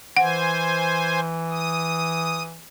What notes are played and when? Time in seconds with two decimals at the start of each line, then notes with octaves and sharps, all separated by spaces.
0.17 E3 C5 F#5 G#5
1.50 D#6